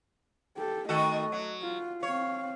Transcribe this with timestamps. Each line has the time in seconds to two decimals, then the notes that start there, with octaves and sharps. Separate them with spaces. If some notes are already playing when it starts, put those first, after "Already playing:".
0.57 G4 A4
0.89 D#3 A3 F#4 A4 D#5
1.32 F#3
1.62 F4
2.03 C4 C#5 F5